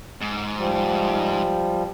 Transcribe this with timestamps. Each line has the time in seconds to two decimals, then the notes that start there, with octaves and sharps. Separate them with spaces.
0.21 G#2
0.57 F3 G3